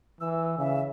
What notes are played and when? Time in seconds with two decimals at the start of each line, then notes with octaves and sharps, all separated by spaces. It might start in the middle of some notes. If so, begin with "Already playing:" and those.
0.20 E3 E6
0.58 C#3 E5